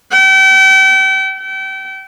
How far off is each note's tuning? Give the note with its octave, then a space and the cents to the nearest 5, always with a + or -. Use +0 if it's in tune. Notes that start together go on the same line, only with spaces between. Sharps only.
G5 -40
G5 -35